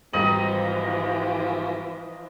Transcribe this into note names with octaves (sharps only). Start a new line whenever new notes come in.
G#1 E3 F3 G3 D#5 A#5 F#7